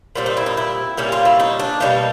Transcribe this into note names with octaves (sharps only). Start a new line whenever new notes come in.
A#2 G3 C4
D#4
E4
D#4
E4
A#2 G3 A#3 C#4
F4
E4
D#4
D4
B2 G3 A#3 D#4